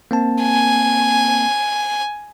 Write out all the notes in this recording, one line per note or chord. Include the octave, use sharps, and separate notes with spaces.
A#3 C4 A5
G#5